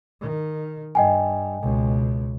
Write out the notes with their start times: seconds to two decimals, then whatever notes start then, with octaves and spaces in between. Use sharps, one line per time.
0.21 D#3
0.95 G2 D#5 G5 G#5
1.62 C#2 B2